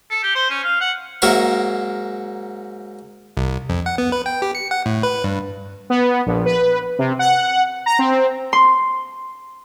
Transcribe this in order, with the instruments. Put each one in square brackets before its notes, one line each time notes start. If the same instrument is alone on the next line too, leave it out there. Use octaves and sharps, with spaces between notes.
[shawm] A4
G4
C5
C#4
F5
F#5
[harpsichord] G#2 F#3 A#3 A#4 E5 C#6
[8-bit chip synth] C2
F2
F#5
B3
B4
G5
G4
C#7
F#5
A2
B4
G2
[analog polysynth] B3
A#1
B4
C3
F#5
A#5
C4
[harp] C6